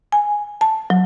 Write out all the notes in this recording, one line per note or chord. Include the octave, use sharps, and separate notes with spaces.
G#5
A5
F#3